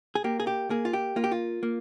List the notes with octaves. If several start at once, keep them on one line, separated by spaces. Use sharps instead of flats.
G#4
A#3 G4
G#4
G4
A#3 G#4
F4
G4
A#3 F4
G4
F4
A#3